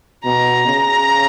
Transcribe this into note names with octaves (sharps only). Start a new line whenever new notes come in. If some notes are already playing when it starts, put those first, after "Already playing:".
B2 A#5
C#3